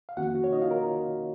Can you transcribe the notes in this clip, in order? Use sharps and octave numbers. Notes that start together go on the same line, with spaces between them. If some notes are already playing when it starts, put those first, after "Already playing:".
F5
F2 D#3 A#3 C#4 F#4 F#5
F#4
C#4 C#5
D#4 D#5
F4 F5
A#4 A#5